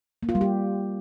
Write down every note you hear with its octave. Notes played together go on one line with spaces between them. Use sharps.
A#3
F4
G3
G4